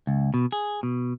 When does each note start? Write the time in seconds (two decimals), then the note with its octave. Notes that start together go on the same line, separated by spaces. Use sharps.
0.07 C#2
0.34 B2
0.52 G#4
0.83 B2